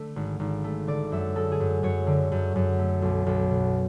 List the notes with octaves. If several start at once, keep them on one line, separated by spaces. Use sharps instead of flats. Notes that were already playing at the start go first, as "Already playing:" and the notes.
Already playing: D3 A3
G#1
G#1
A3
D3 D5
F#2 E5
G#3 A4
G#4
F#2
F#2 C#5
D3
F#2
F#2
A3
B1
B1
B2